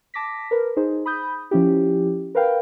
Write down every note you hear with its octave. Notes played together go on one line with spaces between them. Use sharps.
A5 D6 A#6 B6
A#4 B4
D#4 G#4 C5
B5 D#6 G6
F3 C#4 E4 G4
A#4 B4 F5 G5